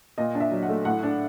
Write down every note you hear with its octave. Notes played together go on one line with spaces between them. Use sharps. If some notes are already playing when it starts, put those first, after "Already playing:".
A#2 D#5
D4
E5
F#3
F#5
A3
A2 F#5
D4